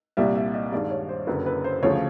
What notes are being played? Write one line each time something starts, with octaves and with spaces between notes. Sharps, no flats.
C2 A#2 G3 E5
E5
D#5
G2 D#3 G#3 D5
C#5
C5
F#1 F#2 D3 B4
B4
C5
D2 C#3 F3 C#5